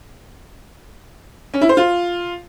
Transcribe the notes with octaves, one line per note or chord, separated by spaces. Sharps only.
C#4
E4
C5
F4